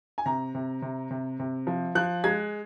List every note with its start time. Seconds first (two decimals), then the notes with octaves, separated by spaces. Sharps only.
0.18 G#5
0.26 C3 A#5
0.55 C3
0.82 C3
1.11 C3
1.40 C3
1.67 F3
1.95 F3 F#6
2.24 G#3 G#6